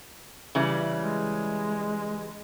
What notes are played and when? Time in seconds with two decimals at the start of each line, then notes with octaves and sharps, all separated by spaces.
0.55 C#3 E3 G3
0.99 G#3